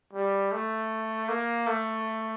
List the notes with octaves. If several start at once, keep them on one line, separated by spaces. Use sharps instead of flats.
G3
A3
A#3
A3